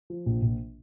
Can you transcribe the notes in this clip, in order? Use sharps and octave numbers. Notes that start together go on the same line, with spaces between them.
F3
A#1
A#1